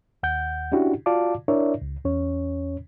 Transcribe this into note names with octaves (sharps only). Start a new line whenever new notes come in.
D#2 F#5 G6
C#4 D4 E4 F#4 G4
F4 F#4 D5 F5 A5 D6
D4 E4 A#4 C#5 D5 E5
C#2
E2 C#4 C#5